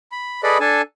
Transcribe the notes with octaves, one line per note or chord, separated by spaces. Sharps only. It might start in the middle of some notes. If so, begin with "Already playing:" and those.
B5
G#4 A4 B4 D5 D#5 B5
D4 A4 G#5 A5